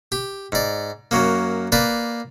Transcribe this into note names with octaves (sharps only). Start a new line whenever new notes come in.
G4
G#2 D5
F#2 F#3 A#3
A#3 B4 D5